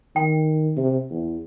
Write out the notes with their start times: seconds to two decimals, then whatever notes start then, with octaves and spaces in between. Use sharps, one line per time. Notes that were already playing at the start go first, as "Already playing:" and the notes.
0.16 D#3 G5
0.77 C3
1.10 E2